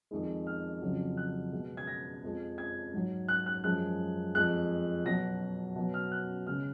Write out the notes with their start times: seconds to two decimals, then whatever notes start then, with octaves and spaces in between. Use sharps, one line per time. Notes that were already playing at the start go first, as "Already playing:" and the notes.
0.11 F2 D#3 G#3
0.47 F6
0.82 F2 C#3 F#3
1.17 F#6
1.53 B2 G#3
1.77 G#6
1.87 A#6
2.23 F2 F3 G#3
2.58 G#6
2.94 G#2 F#3
3.28 F#6
3.46 F#6
3.64 F#2 F3 G#3 F#6
4.35 F2 F3 G#3 F#6
5.05 B2 F#3 A#6
5.75 B2 F#3
5.94 F6
6.12 F#6
6.47 C#3 G#3 F6